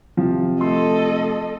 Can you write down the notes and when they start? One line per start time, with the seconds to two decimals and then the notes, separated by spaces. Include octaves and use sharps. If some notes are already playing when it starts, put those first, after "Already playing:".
0.17 C3 F3
0.61 A3 A4 D#5 C6